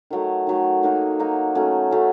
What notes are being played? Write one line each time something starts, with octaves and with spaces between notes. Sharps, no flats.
D#3 F#3 A3
D#3 F#3 A3
F#3 A#3 D#4 F#4
F#3 A#3 D#4 F#4
F#3 A3 C#4
F#3 A3 C#4